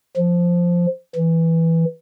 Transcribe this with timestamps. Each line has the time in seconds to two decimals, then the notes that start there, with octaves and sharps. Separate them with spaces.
0.17 F3
1.16 E3